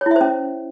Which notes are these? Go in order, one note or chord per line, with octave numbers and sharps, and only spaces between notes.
C#4 E4 C5 C#5 E5